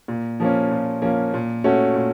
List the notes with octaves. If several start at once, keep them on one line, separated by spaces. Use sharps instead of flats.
A#2
F3 A#3 C#4
A#2
F3 A#3 C#4
A#2
A3 C#4 F#4
A#2